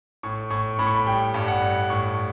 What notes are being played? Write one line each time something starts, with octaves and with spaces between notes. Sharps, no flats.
A2 C#6
A2 C#6
A2 B5
C#6
B5
G3 G5
G2
F#5
G2
A2 C#6